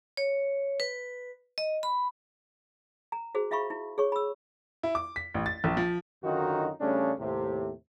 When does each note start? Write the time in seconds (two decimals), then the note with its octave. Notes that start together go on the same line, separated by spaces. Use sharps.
0.17 C#5
0.80 B4
1.58 D#5
1.83 B5
3.12 A#5
3.35 F#4 G#4 C5
3.51 F4 E5 F5 B5 C#6
3.70 E4
3.98 G#4 C#5 C#6
4.12 B5 E6
4.83 E4
4.95 D6
5.16 B6
5.34 A1
5.46 A6
5.64 A#1
5.77 F3
6.23 F#2 D3 D#3 D#4 F4 F#4
6.80 C#3 G3 A3 C#4 D4
7.19 D#2 A2 C3